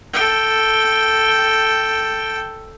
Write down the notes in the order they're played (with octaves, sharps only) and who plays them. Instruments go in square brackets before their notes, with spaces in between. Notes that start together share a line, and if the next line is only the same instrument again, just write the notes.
[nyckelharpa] A4 G5